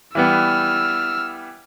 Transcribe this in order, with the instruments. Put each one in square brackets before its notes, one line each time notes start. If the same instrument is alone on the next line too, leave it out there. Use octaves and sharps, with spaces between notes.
[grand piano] E3 G3 B3 [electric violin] E6 F6